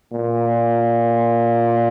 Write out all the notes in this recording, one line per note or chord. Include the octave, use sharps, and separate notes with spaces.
A#2